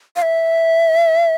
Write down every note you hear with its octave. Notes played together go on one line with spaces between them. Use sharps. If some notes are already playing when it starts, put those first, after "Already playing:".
F5
E5